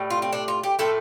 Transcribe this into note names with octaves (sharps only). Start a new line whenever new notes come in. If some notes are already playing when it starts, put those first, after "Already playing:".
Already playing: A2 G3
F4
C4
D4
F4
G4
A2 F3 A3 A4